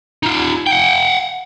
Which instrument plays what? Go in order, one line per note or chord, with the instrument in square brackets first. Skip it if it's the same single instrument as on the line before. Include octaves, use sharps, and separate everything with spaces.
[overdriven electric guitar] D#4 F4
F#5 G5